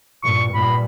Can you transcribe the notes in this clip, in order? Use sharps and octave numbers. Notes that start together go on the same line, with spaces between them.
G2 A#2 C#6
G2 A#2 B5